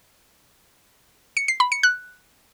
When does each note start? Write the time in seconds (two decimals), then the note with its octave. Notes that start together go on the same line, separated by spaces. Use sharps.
1.37 C#7
1.48 C7
1.60 B5
1.72 C#7
1.83 F#6